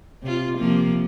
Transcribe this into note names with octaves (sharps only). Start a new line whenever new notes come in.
C3 F4
C3 F3 A#3